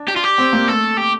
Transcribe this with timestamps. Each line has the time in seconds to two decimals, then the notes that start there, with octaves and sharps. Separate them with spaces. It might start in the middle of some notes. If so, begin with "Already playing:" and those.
Already playing: D4
0.08 G4
0.16 F4
0.24 G4
0.38 C4
0.53 A#3
0.68 A3 A4
0.98 G4